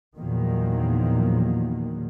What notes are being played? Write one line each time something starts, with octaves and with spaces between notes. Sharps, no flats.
E2 A#2 D#3 F3 F#3 A#3